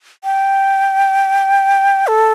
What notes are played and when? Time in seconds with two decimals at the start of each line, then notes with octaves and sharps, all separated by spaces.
0.24 G5
2.07 A4